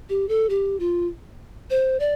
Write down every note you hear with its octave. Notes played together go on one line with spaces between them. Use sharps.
G4
A4
G4
F4
C5
D5